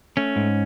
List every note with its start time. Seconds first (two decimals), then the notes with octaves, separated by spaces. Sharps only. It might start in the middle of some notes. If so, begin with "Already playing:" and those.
0.17 A3 C#4
0.36 G#2